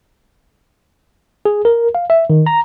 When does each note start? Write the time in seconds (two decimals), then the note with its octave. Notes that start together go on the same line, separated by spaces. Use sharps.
1.45 G#4
1.65 A#4
1.95 F5
2.10 E5
2.30 D#3
2.46 A#5